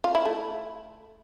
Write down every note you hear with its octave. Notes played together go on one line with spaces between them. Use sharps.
F4
E4
A3